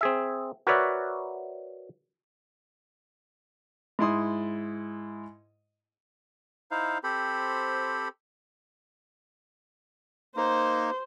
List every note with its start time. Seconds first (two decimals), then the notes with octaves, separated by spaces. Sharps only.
0.01 C4 G#4 E5
0.67 F#4 A#4 B4 C#5 D5 E5
3.99 G#2 E4 C6 D#6
6.71 D#4 E4 C5 F5
7.04 C4 G4 A4 C5 B5
10.36 A#3 D#4 C5